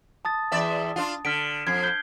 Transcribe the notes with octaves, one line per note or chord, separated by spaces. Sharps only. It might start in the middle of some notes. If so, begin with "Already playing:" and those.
A5 D#6 A6
E2 D5 E5
D4 F4
D3 F6 B6 D7
F2 G#6 C7
G6 G7